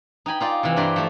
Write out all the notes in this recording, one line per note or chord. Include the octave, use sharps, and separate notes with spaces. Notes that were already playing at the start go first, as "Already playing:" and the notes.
D#4 G5 G#5 B5
D#4 F4 D5
C3 E3
G2 A#4 B4 D5 C6
F3 A3